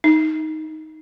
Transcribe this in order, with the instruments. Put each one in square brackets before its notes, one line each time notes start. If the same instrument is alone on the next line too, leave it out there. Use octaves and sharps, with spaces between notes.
[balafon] D#4